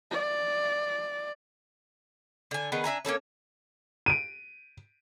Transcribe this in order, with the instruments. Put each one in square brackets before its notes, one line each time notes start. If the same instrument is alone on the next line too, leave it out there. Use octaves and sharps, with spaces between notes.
[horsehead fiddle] D5
[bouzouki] D3 G#5
D#3 B3 G#4
D4 E5 G#5 A#5
A#3 C#4 A4 C#5
[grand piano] D7 D#7